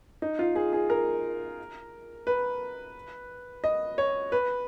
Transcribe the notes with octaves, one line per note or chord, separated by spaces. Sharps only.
D#4
F4
G#4
G#4
A#4
B4
D#5
C#5
B4